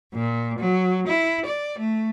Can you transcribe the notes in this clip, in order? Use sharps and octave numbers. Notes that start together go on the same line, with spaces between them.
A#2
F#3
E4
D5
A3